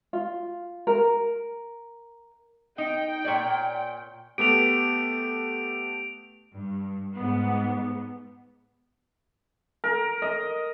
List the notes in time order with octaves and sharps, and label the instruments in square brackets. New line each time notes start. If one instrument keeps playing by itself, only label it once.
[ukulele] F4
A#4
[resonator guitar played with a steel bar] D#4 [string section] G5
[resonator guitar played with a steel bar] A#2 C#5 D5
[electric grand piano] A3 B3 G4 [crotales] D7 F7
[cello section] G2
G#2 B3
[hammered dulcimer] A#4
D#5